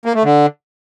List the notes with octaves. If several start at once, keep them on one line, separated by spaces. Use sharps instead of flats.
A#3
A3
D3